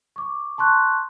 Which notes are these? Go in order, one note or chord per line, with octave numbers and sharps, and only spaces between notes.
C#6 D6
A5 C6 C#6 F#6